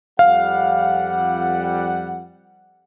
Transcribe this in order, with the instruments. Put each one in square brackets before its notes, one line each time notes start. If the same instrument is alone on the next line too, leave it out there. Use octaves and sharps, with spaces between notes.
[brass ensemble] F2 G3 F#5 [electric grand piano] F5